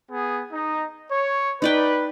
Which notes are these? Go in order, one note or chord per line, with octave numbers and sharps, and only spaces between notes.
B3 G#4
D#4
C#5
D#4 B4 D5 G5